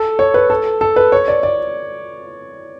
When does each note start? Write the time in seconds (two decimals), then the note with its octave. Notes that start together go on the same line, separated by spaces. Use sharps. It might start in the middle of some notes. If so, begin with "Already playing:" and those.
Already playing: A4
0.19 C#5
0.34 B4
0.50 A4
0.81 A4
0.96 B4
1.12 C#5
1.28 D5
1.43 D5